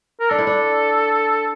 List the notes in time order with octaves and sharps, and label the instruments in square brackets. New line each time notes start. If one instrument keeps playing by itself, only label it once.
[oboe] A#4
[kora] D4 [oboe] A4
[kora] E4
D4